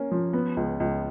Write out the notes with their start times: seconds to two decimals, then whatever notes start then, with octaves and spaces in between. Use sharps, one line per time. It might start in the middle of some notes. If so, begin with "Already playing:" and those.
Already playing: A#3 C#4
0.11 F3
0.33 B3
0.57 C#2
0.80 C#2